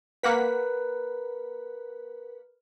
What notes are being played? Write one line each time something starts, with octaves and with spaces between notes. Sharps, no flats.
A#3 A#4 B4 F#5 B6